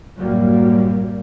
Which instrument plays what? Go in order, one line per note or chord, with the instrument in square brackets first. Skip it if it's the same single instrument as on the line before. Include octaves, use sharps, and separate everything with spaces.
[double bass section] F#2 A2 F#3 G3 A#3